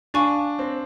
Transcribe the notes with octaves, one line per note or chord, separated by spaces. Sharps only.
D4 F5 G#5 C#6
C4